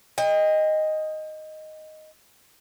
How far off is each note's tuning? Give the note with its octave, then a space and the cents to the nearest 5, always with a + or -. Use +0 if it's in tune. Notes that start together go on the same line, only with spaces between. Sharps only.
D#5 +0 G5 +40